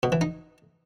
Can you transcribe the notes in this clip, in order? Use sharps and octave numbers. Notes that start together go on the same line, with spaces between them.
B2
E3
D#4